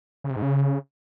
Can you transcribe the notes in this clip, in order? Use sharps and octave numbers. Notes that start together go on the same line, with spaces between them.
C#3
C3
G#2
C#3